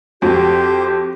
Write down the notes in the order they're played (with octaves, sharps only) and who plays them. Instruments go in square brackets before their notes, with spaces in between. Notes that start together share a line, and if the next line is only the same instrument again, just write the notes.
[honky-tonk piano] F2 [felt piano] F#4 [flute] G4 [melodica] C5